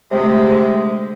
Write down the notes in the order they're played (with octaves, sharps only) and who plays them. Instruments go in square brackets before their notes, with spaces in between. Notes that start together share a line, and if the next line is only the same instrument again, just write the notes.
[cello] D2 G#3 [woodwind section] C3